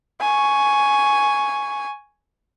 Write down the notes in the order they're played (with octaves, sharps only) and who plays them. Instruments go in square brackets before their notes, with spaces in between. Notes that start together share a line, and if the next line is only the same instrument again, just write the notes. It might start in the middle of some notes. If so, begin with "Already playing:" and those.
[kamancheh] G#5 C#6